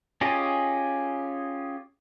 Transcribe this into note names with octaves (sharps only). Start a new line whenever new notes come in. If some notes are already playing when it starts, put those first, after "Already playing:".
C#4 F4 G4 G#4 D#5